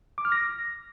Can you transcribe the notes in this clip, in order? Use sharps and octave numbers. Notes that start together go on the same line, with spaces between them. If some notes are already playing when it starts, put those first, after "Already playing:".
D6
F6
A#6